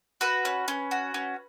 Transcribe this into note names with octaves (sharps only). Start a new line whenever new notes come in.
F#4 B4
C#4
C#4
F#4
C#4